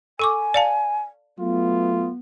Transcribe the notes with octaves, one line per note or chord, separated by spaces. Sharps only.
A4 G#5 C#6 D6
D5 F5 A5
F#3 A3 B3 F4